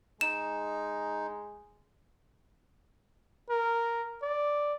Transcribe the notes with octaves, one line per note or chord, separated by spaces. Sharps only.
G#3 D#4 E7
A#4
D5